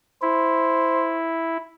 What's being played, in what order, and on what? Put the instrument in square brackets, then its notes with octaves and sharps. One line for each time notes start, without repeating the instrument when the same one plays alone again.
[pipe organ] E4 [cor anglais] C5